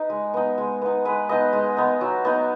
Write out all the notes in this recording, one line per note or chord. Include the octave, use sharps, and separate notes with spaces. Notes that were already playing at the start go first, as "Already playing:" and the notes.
Already playing: D#4 B4 D#5
G#3
B3 D#4
G#3
B3 D#4
G#3 B4
B3 D#4 D#5
G#3
B3 D#4
F#3
B3 D#4